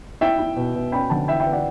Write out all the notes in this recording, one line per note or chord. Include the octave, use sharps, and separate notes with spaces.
E4 E5 G5
E4
B2
B2
C#4 G5 B5
D3 F#5 A5
E3 E5 G5
E5 G5
B3
D5 F#5